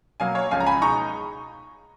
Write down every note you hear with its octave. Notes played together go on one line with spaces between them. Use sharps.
B2 F#3 A#3 F5 G#5
C#5 F5
C#2 C#3 F3 F5 G#5
A#5
G#5 B5
B2 G#3 D#4 A#5 C#6